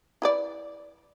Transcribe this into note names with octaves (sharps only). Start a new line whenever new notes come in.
E4 B4 D5